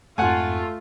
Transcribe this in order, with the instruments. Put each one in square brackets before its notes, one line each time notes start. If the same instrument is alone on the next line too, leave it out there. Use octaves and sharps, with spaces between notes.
[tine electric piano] F2 G#2 [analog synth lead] A3 [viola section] F4 [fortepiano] F#5 G#5